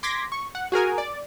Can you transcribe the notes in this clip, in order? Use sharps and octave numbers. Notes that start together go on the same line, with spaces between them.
C6 D6 G#6 A#6 B6
C#6
F#5
F#4 G#4 A#4 G#5
D5